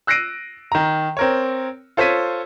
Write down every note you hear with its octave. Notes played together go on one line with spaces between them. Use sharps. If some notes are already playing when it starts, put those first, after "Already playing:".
E6 F#6 A#6 C7 D7 D#7
D#3 A#5
C4 A#4 C#5
F4 A4 C5 C#5 B6 D#7